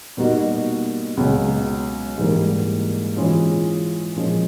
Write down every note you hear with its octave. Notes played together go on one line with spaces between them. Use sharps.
B2 G3 A#3 D#4 F#4
C#2 B2 F#3
G#2 E3 G3 A#3
E3 G#3 C#4 F4 G#4
A#2 F3 G#3 C#4